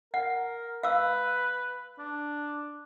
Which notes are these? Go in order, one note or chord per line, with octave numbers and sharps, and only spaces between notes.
A#4 F#5
B4 F5 E6
D4